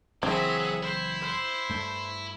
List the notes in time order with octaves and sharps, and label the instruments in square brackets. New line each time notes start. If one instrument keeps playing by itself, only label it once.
[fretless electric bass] F#1 E3 [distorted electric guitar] F#3 [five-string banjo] C4 [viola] G#4 E5
[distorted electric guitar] E4 [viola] C5
[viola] C5
[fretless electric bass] G2 A3